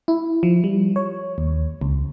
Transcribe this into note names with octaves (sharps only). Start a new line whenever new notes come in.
E4
F3
G3
C#5
D#2
C#2